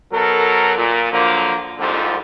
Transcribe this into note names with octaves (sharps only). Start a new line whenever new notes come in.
B2 F#3 A4 A#4
A#2
D3 F3 F#3 A#3
C2 F2 G#2 D3 F3